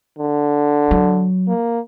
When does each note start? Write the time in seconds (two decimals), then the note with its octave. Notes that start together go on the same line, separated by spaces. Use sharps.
0.18 D3
0.91 F#3
1.48 A#3